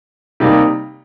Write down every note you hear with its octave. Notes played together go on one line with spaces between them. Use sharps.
C3 G3 A#3 D#4